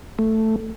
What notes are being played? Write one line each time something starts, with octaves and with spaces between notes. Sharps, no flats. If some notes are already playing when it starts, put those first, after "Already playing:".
A3